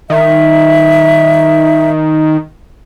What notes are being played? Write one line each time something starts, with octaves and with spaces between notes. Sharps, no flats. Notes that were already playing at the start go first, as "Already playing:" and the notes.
D#3 E5